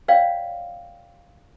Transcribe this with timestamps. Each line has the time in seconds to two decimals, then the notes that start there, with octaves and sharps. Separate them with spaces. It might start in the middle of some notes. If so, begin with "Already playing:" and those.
0.08 C#5 D5 F5 G5